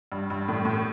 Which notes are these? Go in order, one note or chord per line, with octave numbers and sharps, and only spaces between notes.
G2
G2
A2
A2